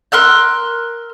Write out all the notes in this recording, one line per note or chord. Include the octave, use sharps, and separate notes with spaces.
A#4 C6 E6 F#6